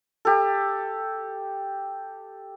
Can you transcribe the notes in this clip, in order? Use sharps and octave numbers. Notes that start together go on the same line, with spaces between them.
G4 A4